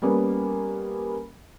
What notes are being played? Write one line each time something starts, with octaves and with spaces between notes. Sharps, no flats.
G3 A#3 B3 C#4